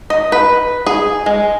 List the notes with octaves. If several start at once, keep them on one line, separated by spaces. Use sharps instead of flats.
D#5
B4
G#4
G#3